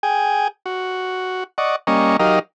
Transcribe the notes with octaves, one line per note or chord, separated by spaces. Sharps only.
G#4 G5 G#5
F#4
D5 D#5 F#5 C#6
G3 A#3 C#4 D#5 C#6
F#3 D#4 G4 A#4 D#5 F5